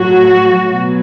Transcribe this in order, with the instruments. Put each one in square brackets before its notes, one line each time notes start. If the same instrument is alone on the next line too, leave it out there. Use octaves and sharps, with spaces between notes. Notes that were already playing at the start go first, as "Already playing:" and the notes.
Already playing: [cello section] A2 F#3 F#4
B2 F#3